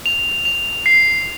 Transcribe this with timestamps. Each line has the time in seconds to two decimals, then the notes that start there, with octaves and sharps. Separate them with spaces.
0.06 F7
0.45 F7
0.86 C7